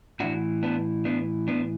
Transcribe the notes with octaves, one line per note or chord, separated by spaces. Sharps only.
A2 E3 D4 F#4
B3 D4
B3 D4
B3 D4